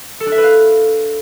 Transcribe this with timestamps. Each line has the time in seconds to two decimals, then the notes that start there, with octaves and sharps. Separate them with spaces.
0.20 A4
0.26 D4
0.32 E5
0.38 B4
0.44 F5